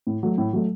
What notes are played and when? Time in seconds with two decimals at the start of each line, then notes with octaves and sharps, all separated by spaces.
0.07 A2
0.23 F#3 A3
0.38 A2
0.53 F#3 A3